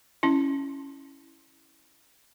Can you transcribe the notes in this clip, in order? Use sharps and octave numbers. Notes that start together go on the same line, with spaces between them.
C#4 E4